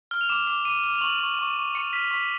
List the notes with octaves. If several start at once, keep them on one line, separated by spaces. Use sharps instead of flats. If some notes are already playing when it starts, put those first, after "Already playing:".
F6
F7
D6 E7
D6
D6 D#7
D6
F7
C#6 F#7
C#6
C#6
C#6
C#6 C#7
F6 B6
C#6 B6